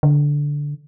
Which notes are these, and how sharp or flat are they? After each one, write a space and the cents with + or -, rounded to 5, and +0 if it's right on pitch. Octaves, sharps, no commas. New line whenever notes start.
D3 -10